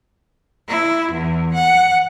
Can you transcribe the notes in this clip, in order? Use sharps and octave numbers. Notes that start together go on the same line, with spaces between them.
E4
E2
F#5